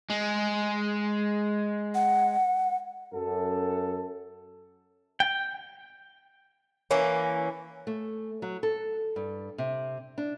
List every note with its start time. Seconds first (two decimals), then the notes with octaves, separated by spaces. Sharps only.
0.10 G#3
1.95 F#5
3.14 F#2 A4
5.20 G5
6.91 E3 A#3 C#4
7.87 A3
8.42 F#3
8.63 A4
9.16 G2
9.58 C3
10.18 D4